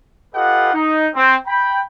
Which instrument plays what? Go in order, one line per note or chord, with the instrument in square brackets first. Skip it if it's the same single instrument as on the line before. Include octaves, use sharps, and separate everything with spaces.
[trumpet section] F4 G4 A4 B4 D#5 F#5
D#4
C4
G5 B5